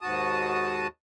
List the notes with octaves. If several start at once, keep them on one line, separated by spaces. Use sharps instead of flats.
D#2 G#2 F#4 A5 D#6